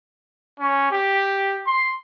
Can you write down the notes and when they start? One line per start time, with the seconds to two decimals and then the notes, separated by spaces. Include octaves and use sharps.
0.59 C#4
0.91 G4
1.66 C6